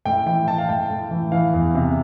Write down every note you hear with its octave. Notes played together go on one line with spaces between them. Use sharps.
A2 G5
E3 G5
E3 A5
F5
A2 G5
A2
E3
E3 F5
E2
C3